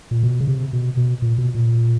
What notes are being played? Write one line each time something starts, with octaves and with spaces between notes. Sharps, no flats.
A#2
B2
C#3
C3
B2
B2
A#2
B2
A#2